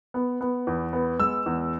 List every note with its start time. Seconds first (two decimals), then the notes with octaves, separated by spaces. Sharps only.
0.14 B3
0.41 B3
0.67 E2
0.93 B3
1.20 G#3 E6
1.46 E2